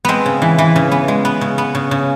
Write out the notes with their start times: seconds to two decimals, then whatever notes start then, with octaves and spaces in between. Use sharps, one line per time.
0.05 G#3 B3 C4
0.26 C#3
0.42 E3
0.58 E3
0.76 C#3
0.91 B3
1.08 G#3
1.25 B3
1.41 C#3
1.58 B3
1.75 C#3
1.91 C#3